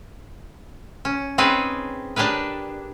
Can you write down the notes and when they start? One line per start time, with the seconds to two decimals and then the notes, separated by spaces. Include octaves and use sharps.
1.05 C#4
1.38 C4 C#4 D#4 G#4 B4
2.16 D4 G4 G#4 A#4 B4